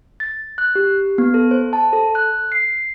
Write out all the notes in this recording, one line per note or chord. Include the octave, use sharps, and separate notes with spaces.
A6
F#6
G4
B3
A4
C5
A5
A4
F#6
C7